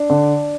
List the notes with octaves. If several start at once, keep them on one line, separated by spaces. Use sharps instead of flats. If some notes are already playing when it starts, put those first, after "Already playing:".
Already playing: D4
D3